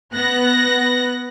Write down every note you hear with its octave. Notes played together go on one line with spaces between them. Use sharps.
B3 F#6 A#6